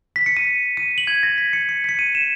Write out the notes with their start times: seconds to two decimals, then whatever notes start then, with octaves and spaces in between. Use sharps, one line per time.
0.16 B6
0.26 C#7
0.37 D#7
0.77 D#7
0.98 F#7
1.07 G#6
1.23 A#6
1.38 B6
1.53 C#7
1.69 C#7
1.84 B6
1.89 C#7
1.99 D#7
2.15 E7